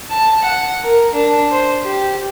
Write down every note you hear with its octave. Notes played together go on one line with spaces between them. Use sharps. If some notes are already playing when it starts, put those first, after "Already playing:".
A5
F#5
A#4
D4
C5
G4